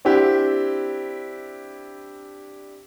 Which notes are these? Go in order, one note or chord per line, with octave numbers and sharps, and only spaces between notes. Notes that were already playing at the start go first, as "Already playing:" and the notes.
C4 D4 E4 G4